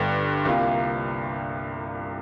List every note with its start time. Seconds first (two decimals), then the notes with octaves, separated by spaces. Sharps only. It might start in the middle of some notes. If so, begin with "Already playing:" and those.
Already playing: G1 G2 D3
0.45 C2 C3 A#3 F4